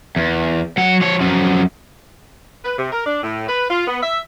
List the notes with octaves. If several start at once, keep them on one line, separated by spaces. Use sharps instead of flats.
E2
F#3 F#5
F3 C#5
F#2 F3
B4
C3
A#4
D4
A2
B4
F4
B3
E5